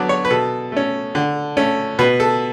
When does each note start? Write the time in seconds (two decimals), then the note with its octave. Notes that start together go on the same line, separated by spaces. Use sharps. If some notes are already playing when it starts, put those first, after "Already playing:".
Already playing: D3 F#3 B3 D4 D5
0.09 C#5
0.25 B4
0.30 B2 A4
0.72 A3 C#4
1.15 D3
1.57 A3 C#4
1.99 B2 B4
2.20 A4